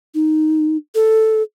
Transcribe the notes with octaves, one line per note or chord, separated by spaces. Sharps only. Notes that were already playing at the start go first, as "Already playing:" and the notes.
D#4
A4